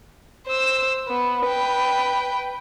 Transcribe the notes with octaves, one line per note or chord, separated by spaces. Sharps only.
C5 E6
B3
B4 G5